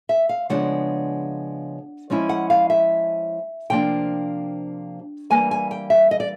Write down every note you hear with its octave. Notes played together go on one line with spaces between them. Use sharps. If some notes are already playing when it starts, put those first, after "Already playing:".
E5
F5
C#3 F3 G#3 B3 D4 F#5
F3 G#3 C#4 E4
F#5
F5
E5
C3 F3 A#3 D4 G5
E3 G3 A#3 G#5
G#5
G5
E5
D#5
D5